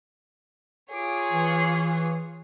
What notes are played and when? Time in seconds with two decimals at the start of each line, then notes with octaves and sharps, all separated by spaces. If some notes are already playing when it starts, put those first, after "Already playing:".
0.93 F4 G#4 C#5 D6
1.32 E3